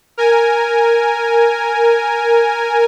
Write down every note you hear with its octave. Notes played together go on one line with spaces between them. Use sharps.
A#4 G#5